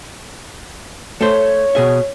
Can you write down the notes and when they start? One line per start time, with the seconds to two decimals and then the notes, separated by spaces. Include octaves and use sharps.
1.21 A3 C5 C#5
1.75 B2 G#4 E5